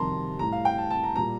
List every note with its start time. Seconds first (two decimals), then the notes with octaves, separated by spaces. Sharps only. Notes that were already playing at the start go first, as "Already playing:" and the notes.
Already playing: F2 C3 D#3 G3 A5 A#5 C6
0.39 A2 G3 A#5
0.52 F5
0.65 G5
0.78 A5
0.91 A5
1.03 A#5
1.16 A#2 G3 A#5